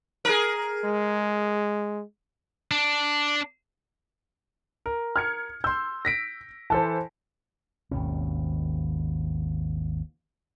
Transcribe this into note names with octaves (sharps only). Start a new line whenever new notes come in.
G#4 A#4
G#3
D4
A#4
F6 G#6 C#7
C6 E6 G6
A#6 B6 D7
E3 A4 C5 A5
G#1 D#2 B2 C#4